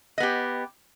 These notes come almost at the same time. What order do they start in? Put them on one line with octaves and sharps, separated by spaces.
D#5 B3 G4